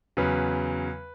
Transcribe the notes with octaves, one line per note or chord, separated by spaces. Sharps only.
E2 C#3 F#3 B4